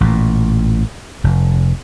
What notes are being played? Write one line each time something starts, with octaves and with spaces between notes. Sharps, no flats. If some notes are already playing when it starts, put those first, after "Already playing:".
A1 A#2
F1